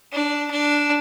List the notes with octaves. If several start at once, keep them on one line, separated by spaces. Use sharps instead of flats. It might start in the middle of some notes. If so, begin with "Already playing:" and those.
D4
D4